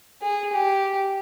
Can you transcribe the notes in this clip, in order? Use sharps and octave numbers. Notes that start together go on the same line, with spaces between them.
G#4
G4